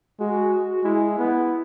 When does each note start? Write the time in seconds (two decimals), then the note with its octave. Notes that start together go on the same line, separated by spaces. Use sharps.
0.20 G#3 F#4
0.85 G#3 E4
1.19 B3